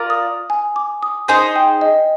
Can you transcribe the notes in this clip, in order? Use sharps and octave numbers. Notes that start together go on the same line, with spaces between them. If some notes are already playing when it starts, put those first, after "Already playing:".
Already playing: F4 A#4 D5
D#6
G#5
D6
D#6
D#4 G#4 C5 G#5
G5
D#5